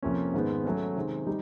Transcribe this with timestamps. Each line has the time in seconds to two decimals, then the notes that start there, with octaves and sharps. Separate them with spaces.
0.03 F2 C3 F3 A#3 C#4
0.34 G#2 D#3 G#3 B3
0.65 F#3 A3 C#4
0.96 C3 D#3 G#3
1.27 G3 D#4 G4